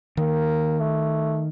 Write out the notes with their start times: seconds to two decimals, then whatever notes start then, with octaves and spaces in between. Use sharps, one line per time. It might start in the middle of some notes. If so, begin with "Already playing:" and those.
0.17 D#3 A#3
0.80 A3